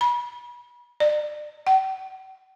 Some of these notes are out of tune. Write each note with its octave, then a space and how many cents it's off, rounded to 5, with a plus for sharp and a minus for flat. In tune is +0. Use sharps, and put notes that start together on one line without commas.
B5 -35
D5 +30
G5 -45